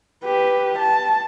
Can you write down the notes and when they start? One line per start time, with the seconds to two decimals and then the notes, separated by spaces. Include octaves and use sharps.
0.24 G4 B4
0.79 A5